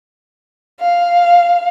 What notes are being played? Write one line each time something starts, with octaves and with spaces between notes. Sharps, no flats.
F5